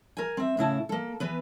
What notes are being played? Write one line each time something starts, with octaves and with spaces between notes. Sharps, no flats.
A#4 G#5
C4 E5
A2 C#3 E4 A5
A#3 A4
E3 B3 B4